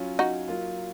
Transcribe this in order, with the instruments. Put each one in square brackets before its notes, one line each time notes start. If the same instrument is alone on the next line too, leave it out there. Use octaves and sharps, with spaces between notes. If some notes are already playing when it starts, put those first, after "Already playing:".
Already playing: [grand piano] F#3 C#4 F4
[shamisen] D#4 F#4
[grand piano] F#3 A#3 F4